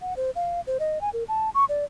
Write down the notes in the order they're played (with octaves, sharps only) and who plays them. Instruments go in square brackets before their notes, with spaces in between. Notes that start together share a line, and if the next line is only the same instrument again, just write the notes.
[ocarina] F#5
C5
F5
C5
D#5
G#5
A#4
A5
C#6
D5